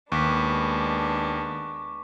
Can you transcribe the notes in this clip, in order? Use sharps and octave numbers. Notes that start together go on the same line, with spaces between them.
D#2 G#3 B3 D4 C#6 D6 B6